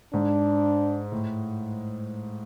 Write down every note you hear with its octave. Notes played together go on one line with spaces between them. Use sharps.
G#2 D4
A2